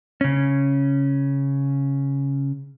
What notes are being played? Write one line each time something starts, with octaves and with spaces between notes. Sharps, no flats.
C#3 C#4